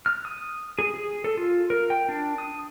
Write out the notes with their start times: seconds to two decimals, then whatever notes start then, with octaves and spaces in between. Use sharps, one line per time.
0.06 F6
0.25 D#6
0.79 G#4
0.94 G#4
1.24 A4
1.37 F4
1.70 A#4
1.90 G5
2.09 D4
2.38 D#6